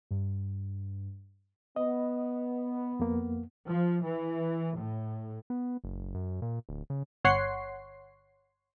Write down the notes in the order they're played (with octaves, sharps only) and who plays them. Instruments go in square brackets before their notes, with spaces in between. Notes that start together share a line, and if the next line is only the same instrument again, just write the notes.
[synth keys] G2
[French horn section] B3 [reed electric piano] D#5
[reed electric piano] F2 A#3
[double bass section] F3
E3
A2
[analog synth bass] B3
F#1
F#2
A#2
D1
C#3
[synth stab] G1 C#5 F#5 C6 C7